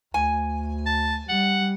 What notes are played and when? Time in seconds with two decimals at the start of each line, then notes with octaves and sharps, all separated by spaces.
0.14 D2 G#5
0.86 A5
1.29 G3 F#5